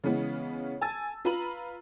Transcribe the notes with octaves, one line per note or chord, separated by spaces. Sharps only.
C#3 E3 G#3 B3 C#4
G#5 A5 E6 A6
F4 B4 A#5 B5 D#7 F#7